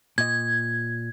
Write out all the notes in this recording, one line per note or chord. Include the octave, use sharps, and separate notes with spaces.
A#2 D#5 G#6